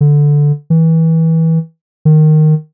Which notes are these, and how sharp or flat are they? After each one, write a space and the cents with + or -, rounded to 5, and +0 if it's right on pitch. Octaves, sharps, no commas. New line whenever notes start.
D3 -5
E3 -25
D#3 -10